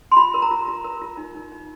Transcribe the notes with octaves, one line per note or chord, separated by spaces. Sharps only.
C6
F4 B5
A#4
A#5
F4
F4
A#4
F4
D#4
D#4
D#4